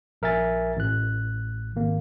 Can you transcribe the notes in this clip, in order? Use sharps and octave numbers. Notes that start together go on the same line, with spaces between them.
A#1 A#4 E5 G#5 A6
A1 F#6
G#1 A#3